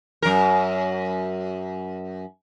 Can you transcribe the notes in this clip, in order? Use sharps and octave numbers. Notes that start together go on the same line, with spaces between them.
F#2 A#4